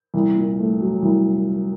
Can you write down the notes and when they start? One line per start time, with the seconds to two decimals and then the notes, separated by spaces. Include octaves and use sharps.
0.14 C2
0.36 A#2
0.58 A3
0.80 F#3
1.02 C2